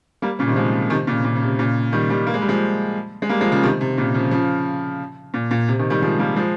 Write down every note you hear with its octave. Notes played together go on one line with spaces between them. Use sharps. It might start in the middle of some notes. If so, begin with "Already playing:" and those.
G3 A#3
A#2 C#3
C3 D#3
F3 G#3
C3 D#3
A#2 C#3
A#2
C#3
C3
A#2 C#3
D#3 G3
D#3 G3
A#3
G#3
G3
F3 G#3
G#3
G3 A#3
F3 G#3
C#3 F3
C3 D#3
C3
A#2 C#3
C#3 F3
C#3 F3
A#2
A#2
C3
C3 D#3
D#3 G3
F3 G#3
G3 A#3
F3 G#3